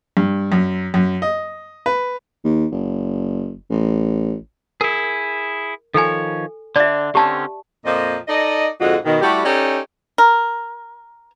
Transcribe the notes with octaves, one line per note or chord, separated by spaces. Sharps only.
G2
F#2
F#2
D#5
B4
D#2
F#1
A1
E4 G#4 A#4
D#3 F3 A4 C#5 G#5
D3 D4 D5 E5
D3 C4 C#4 G4 A5
F2 A#2 F3 D#5
D#4 A4 D5 D#5
F2 G#2 D3 D#4 F4 F#4
B2 D#3
G3 A3 E4 F#4 G4
C#4 D#4 G4 A4 C#5 D5
A#4